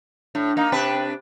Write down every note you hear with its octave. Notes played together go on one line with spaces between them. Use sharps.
A2 D4
A#3 D#4
C3 D4 B4 G5